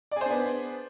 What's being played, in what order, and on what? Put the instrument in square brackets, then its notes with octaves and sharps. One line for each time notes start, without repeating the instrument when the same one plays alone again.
[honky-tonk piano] D5
G#4
C5
D4
B3